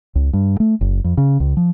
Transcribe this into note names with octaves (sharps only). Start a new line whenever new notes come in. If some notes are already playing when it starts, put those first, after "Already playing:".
C#2
G2
A3
F#1
F2
C#3
C#2
F3